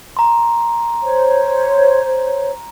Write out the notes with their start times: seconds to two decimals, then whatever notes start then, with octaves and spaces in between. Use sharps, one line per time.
0.17 A#5 C6
1.02 C5 C#5